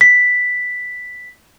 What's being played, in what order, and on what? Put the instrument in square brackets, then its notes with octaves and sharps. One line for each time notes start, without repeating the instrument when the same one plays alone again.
[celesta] B6